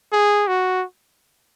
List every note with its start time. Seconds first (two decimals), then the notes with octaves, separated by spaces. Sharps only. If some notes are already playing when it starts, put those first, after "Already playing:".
0.12 G#4
0.47 F#4